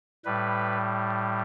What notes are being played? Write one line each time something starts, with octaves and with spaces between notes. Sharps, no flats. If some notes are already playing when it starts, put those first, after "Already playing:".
A2 G3 B4